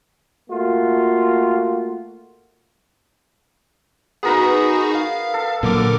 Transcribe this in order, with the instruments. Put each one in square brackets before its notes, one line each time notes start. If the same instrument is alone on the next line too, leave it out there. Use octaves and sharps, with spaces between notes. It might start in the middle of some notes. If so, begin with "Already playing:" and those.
[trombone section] A3 A#3 F4 F#4
[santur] B3 A#4 B4 [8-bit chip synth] D#4 F#4 G#4
[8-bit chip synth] F5
[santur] A4
[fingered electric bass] A#2 F#3 [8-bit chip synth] D3 A#4 D6